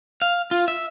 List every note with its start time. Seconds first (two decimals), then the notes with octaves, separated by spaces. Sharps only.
0.22 F5
0.51 F4
0.68 E5